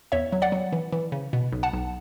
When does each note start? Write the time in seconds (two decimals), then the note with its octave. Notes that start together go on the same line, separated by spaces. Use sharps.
0.12 E2 C#5 E5
0.32 F#3
0.42 D5 F#5
0.52 F#3
0.73 E3
0.92 E3
1.12 C#3
1.33 B2
1.52 B1
1.63 F#5 A5
1.73 B1